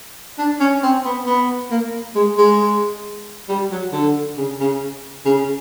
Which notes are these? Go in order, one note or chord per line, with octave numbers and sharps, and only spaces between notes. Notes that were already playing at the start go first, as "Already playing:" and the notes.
D4
C#4
C4
B3
B3
A#3
G#3
G#3
G3
F#3
D3
C#3
C#3
C#3